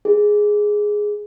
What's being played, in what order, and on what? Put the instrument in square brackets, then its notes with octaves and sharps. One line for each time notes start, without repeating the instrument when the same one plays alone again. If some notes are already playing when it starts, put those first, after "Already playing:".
[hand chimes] G#4